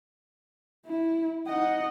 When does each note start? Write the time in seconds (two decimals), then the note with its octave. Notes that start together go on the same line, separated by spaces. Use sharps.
0.86 E4
1.47 D#4 D#5 F#5